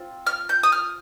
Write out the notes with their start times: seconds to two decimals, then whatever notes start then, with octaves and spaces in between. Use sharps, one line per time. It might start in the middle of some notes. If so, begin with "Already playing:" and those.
Already playing: C4 F4
0.26 F6
0.49 G6
0.63 D#6
0.72 F6